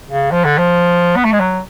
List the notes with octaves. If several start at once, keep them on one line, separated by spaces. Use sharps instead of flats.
C#3
F3
D3
F3
B3
A3
G#3
F#3